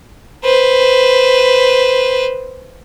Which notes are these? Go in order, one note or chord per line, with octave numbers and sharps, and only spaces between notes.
B4 C5